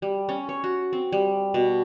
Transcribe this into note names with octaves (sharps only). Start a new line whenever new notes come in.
G3
C#4
C#5
F#4
C4
G3
B2